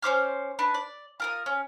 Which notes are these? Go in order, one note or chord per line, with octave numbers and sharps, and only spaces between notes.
C#4 C5 D6 F6
D4 B4
D5
F4 A#4 D#6
C#4